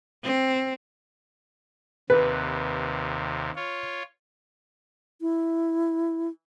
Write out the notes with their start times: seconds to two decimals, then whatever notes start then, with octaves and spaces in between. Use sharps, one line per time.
0.24 C4
2.10 D#2 C3 B4
3.56 F4 C#5
5.21 E4